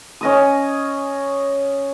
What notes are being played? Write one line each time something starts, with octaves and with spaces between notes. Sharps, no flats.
C#4 D#5 D#6